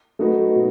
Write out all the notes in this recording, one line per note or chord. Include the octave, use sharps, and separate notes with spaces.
F#3 A3 D#4 F#4 B4
B2